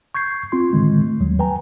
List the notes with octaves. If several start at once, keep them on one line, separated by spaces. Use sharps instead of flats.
C#6 G6 G#6 C7
C4 F4 C6
A2 D3 D#3 G#3
A3
D#2 F#3
B4 G5 G#5 A#5